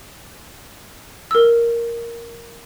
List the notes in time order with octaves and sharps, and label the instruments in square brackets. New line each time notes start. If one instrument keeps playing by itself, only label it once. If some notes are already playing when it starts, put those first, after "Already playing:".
[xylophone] A#4 E6